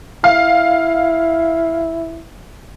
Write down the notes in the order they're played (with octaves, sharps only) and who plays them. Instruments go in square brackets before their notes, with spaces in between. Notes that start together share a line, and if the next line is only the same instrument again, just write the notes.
[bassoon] E4 [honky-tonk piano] F5